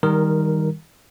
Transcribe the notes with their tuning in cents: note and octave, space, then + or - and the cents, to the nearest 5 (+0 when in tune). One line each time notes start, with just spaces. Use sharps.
D#3 +20 G3 +15 A#4 +0